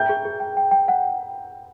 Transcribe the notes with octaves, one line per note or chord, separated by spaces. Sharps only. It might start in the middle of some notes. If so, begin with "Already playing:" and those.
Already playing: E5 G5 G6
G#4
G#4
G5
G5
G5
F#5